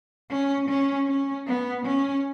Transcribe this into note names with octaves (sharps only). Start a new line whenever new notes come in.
C#4
C#4
C#4
B3
C#4